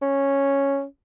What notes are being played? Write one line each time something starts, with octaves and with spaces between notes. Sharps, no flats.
C#4